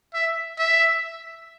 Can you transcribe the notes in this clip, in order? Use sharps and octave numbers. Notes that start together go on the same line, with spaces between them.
E5
E5